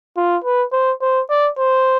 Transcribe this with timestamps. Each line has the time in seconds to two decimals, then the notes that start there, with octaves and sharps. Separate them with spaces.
0.17 F4
0.44 B4
0.73 C5
1.02 C5
1.30 D5
1.58 C5